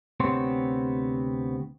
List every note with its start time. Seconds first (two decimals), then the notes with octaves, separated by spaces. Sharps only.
0.20 D2 C3 B3 C4 C#5 C6